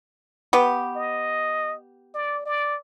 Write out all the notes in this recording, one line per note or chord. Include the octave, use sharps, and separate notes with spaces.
B3 G4
D#5
D5
D5